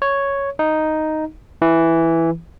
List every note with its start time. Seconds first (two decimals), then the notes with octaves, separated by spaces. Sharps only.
0.02 C#5
0.59 D#4
1.62 E3